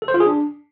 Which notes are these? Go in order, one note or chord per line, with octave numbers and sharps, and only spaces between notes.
A4
C5
F4
G#4
D4